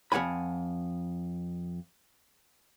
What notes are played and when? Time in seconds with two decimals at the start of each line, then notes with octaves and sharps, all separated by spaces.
0.12 F2 F#3 F#5 G#5 B5